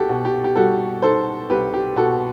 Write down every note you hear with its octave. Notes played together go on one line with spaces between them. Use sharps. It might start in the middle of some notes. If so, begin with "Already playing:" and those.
Already playing: C2 F#4 G4 A4
B2
G4
G4
G3 F#4 A4
D#4 A4 C5
C2 G4 B4
G4
B2 F#4 A4